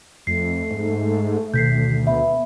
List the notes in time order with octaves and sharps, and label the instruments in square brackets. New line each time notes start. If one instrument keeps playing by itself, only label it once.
[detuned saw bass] F2 [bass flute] A3 [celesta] C7
[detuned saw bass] G#2
[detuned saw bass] D2 [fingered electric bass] B2 D#3 [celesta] G6 B6 C7
[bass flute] B3 [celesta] E5 B5